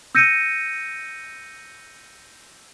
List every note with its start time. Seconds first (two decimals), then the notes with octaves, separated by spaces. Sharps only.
0.15 E6 G6 A#6 C#7 D#7